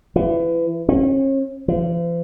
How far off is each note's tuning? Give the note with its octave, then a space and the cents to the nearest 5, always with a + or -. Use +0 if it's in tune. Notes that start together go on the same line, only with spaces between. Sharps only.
E3 +25
C#4 -40
F3 -45